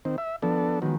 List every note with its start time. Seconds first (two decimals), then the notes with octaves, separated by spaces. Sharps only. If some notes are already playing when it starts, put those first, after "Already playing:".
0.05 D#3 C4
0.18 E5
0.42 F3 B3 D4 A4
0.82 D#3 F#3 G#3 B3